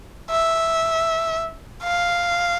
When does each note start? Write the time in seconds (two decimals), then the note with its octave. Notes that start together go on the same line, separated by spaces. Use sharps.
0.30 E5
1.83 F5